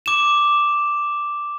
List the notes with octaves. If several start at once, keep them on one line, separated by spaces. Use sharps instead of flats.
D6 E7